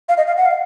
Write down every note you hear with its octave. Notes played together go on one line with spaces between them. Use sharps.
F5
D#5
F5
F#5
F5